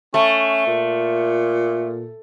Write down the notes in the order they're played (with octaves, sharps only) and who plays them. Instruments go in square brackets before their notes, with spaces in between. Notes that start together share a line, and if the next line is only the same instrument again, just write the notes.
[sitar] A3 [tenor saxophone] C#4
[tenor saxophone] A#2